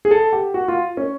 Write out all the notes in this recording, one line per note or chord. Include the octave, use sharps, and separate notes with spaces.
G#4
A4
G4
F#4
F4
C#4